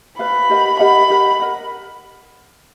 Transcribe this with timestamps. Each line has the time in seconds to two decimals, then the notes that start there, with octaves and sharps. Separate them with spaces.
0.19 B4 D5 F5 B5
0.50 G4 A#4 D#5 F#5
0.79 G4 A#4 D#5 F#5 B5
1.10 G4 A#4 D#5 F#5
1.40 A#4 D#5 F#5